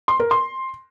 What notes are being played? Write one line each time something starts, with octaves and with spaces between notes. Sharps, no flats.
C6
A#4
C6